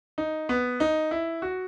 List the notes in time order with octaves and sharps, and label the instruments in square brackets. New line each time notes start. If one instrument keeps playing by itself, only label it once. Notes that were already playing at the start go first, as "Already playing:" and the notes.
[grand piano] D#4
B3
D#4
E4
F#4